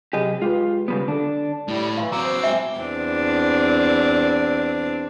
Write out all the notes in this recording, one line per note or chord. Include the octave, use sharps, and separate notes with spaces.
C3 F#3 G4 G#4 D#5
G#3 F4 G4 B4
C#3 G3 B3
D3 D4 A4
A2 G3
E3 F5 C6
F#3 C4 A#5 D6 E6
C5
G#3 E5 G5 G#5
E2 C4 D4